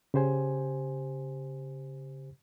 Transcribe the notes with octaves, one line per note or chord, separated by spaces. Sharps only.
C#3 G4 C5 G#5